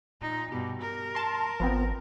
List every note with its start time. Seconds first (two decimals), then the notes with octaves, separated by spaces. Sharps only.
0.22 A#2 D#4
0.52 G2 B2 G4
0.81 A#4
1.15 A5 C6
1.60 G#1 F3 B3 C4